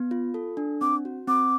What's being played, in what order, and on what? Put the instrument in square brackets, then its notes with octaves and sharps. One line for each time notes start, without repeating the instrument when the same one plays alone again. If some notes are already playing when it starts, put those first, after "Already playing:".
Already playing: [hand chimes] B3
F4
A4
D4
[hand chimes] C4 [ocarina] D6
[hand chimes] F#4
[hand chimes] C4 [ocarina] D6